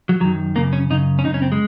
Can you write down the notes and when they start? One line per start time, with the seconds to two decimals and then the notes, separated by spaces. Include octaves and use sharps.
0.09 F#3
0.20 F#2 D#3 F#3
0.55 F#2 C#3 A#3
0.73 C#4
0.90 F#2 C#3 D#4
1.19 C#4
1.25 F#2 C#3 D#4
1.34 C#4
1.42 C4
1.52 G#3